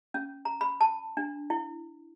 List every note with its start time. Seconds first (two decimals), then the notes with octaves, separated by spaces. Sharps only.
0.14 C#4
0.45 A#5
0.61 B5
0.81 A5
1.17 D4
1.50 E4